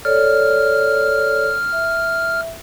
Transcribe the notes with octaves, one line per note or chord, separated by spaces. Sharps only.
A4 C#5 D5 F6
E5